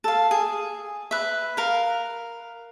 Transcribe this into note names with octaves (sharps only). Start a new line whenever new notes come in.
A4 F5
G#4
B4 E5
A#4 F5